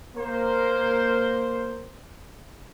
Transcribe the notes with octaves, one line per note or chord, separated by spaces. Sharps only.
A#3 A#4 C5